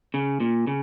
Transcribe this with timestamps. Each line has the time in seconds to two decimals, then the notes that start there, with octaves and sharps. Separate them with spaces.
0.14 C#3
0.40 A#2
0.67 C#3